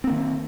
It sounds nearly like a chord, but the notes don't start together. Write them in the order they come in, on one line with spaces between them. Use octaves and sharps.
C4 A#3 D#3